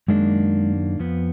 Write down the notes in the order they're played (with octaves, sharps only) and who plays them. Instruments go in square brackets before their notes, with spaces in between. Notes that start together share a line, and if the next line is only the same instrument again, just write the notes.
[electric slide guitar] F#2 D#3 A#3 D4 [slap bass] G#3
[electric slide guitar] F2 F3 B3